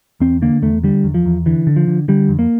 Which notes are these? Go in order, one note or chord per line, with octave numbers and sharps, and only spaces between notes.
E2 C4
D3 A#3
E2 A3
D3 G3
E2
F3
E2
D3 E3
D3
F3
D3
D3 G3
F2
A#3